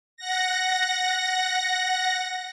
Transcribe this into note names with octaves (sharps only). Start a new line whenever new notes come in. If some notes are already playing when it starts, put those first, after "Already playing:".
F#5 A#6